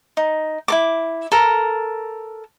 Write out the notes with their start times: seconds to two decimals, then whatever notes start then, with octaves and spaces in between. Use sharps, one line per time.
0.17 D#4
0.68 E4 A4 D6
1.32 A4 A#4